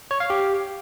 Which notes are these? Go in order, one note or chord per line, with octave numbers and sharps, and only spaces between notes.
C#5
F5
G4